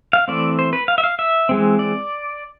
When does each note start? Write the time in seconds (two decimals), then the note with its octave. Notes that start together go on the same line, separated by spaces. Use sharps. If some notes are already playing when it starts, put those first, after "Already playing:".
0.13 F5
0.28 E3 A3 C4 D5
0.59 C5
0.73 B4
0.88 F5
0.98 E5
1.04 F5
1.19 E5
1.49 E3 G#3 C4
1.79 D5